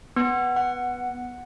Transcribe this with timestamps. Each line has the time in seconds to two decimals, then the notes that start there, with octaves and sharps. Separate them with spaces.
0.16 B3
0.56 F#5